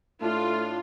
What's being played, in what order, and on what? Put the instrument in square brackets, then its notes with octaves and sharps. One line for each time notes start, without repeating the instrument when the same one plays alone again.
[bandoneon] A2 D4 [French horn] A3 [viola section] F4